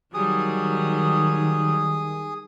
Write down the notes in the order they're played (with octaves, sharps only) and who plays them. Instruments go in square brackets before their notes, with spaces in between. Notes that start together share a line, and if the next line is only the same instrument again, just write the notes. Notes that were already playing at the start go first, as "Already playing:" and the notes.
[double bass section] D#3 [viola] F#3 G3 [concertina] G#4 D#6